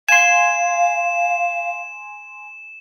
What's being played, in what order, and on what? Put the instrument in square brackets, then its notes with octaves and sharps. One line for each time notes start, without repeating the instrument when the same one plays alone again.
[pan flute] F5 [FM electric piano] G#5 C6 [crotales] E7